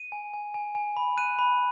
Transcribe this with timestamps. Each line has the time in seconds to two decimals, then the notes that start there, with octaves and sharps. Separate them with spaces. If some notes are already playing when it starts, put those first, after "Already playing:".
Already playing: D#7
0.12 G#5
0.34 G#5
0.54 G#5
0.75 G#5
0.97 B5
1.17 F#6 D#7
1.39 B5